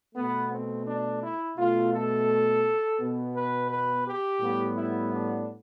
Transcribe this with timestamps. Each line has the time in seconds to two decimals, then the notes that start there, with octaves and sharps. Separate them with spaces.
0.15 B2 A3 B3
0.51 C4
0.86 D4
1.22 E4
1.57 B2 A3 F4
1.93 A4
2.99 B2 B3
3.35 B4
3.70 B4
4.06 G4
4.40 A2 G3 B3
4.76 E4
5.12 D4